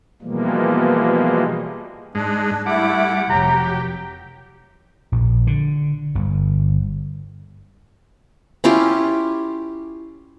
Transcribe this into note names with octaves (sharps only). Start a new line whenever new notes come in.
B2 E3 F3 G3 G#3 A#3
G#2 G#3 D4
G3 A3 E4 F#5 D6
F1 F#3 G4 A#5
A#1
D3
G1
C#4 E4 F4 G4